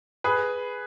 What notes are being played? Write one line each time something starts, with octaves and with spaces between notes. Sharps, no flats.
G#4 B4